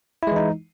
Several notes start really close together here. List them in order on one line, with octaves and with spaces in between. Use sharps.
E4 G#3 E3 D#4